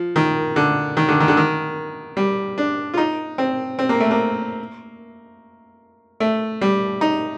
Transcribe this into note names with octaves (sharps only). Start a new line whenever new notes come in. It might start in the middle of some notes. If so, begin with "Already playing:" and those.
Already playing: F3
D#3
D3
D#3
D3
D#3
D3
D#3
G3
D4
F4
D#4
C4
C4
A#3
A3
A#3
A3
G3
D#4